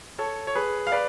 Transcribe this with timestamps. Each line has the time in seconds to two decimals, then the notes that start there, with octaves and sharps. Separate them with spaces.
0.19 A4 C#5
0.47 C#5
0.55 G#4 B4
0.87 F5
0.92 B4 D5